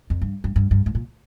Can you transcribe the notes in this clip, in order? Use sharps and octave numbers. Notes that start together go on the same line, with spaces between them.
F2
G2
G2
G2
G2
G#2
A#2